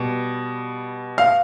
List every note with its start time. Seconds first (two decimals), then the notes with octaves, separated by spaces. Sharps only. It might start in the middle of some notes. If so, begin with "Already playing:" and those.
Already playing: B2 G3
1.18 F5